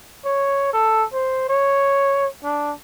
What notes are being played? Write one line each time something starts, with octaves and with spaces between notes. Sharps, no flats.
C#5
A4
C5
C#5
D4